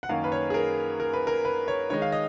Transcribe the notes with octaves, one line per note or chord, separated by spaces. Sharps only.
F#5
F#2 D#3 A#3 C#4 F5
B4
C#5
G#4
A#4
A#4
B4
A#4
B4
C#5
D#3 G#3 D#4 C#5
F5
D#5